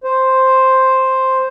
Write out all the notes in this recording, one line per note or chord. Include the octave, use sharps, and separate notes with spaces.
C5